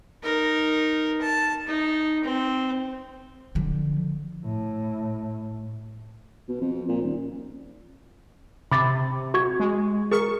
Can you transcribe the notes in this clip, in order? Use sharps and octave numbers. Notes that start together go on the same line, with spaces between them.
D#4 A#4
A5
D#4
C4
D3 F3
A2
B2
F2
A#2
D#1
C3 B5 D6 A6
F#4 C#6 G#6
G#3
G#4 A#4 C#6